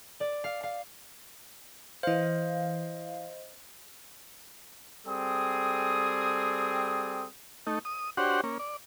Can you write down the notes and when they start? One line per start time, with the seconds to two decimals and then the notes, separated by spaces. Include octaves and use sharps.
0.20 D5
0.44 F5
0.63 F5
2.03 E3 C5 D#5 F5
5.07 G3 C4 G#4 A4 D#6
7.67 A3 D#4
7.85 D#6
8.17 D4 F#4 G4 C5 C#5 F#5
8.44 A#3 C#4
8.59 D5